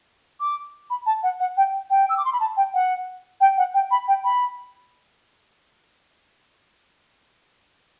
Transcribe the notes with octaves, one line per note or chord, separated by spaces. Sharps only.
D6
B5
A5
F#5
F#5
G5
G5
E6
D6
C6
B5
A5
G5
F#5
G5
F#5
G5
B5
G5
B5